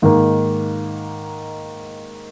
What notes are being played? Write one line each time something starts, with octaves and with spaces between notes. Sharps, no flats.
G#2 D#3 A#3